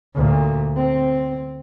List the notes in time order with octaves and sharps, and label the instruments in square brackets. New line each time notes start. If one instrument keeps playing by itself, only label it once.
[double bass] D2 A#2
C4